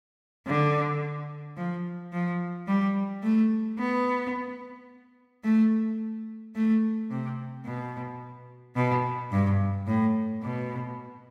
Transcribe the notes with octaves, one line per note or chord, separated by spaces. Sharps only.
D3
F3
F3
G3
A3
B3
A3
A3
C3
B2
B2
G2
A2
B2